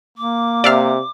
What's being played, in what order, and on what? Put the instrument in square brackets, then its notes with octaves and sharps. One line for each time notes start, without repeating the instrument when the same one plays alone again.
[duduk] A#3 [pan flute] D6
[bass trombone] C3 [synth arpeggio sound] D5 E5 F5